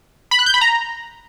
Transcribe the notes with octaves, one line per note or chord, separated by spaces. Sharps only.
B5
F#6
G6
B5
A#5